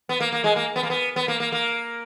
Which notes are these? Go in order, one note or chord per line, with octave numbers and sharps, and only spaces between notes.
B3
A#3
A#3
G#3
A#3
B3
A#3
B3
B3
A#3
A#3
A#3